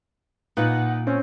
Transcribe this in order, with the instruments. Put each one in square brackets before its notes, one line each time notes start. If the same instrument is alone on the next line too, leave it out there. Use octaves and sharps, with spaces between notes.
[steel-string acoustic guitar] A#2 [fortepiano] D#4 F4 B4 [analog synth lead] F#5
[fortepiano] C4 [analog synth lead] C#4